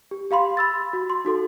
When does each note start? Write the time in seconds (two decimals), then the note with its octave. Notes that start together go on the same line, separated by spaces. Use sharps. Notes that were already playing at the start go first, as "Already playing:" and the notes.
0.11 G4
0.31 G4 F5 B5 C6
0.57 B5 E6 A6
0.93 F#4
1.10 C6
1.25 D#4 F#4 A4